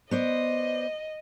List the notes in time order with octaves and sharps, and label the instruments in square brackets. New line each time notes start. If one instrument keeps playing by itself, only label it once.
[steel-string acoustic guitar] B3 C5 D5 [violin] D#5